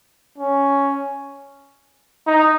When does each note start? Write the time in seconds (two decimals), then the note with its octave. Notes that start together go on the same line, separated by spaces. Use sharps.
0.38 C#4
2.27 D#4